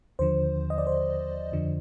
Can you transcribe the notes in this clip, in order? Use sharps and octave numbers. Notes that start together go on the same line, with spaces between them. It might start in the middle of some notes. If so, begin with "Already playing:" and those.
D#2 D3 F3 C5
D#5
D5
C5
F2 D3 F3